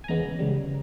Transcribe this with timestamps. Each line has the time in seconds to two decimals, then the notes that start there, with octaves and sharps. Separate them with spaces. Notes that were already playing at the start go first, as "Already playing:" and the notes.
0.04 G#5
0.08 E2 C#3 G#3 B3 A#5
0.39 C#2 C#3 G3